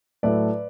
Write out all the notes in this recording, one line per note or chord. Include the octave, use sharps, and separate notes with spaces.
A2 F#3 A3 B4 D5